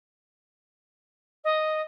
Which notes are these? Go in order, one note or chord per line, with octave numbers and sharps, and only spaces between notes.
D#5